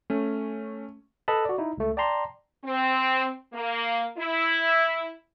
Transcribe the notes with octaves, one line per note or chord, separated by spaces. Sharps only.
A3 C#4
A4 B4 D#5 A5 B5
F#4 D5
D#4 E4
C#2 A3
D5 G5 A5 A#5 C6
C4
A#3
E4